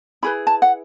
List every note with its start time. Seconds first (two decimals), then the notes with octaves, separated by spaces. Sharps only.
0.23 E4 G#4 B4 B5
0.47 A5
0.62 F#5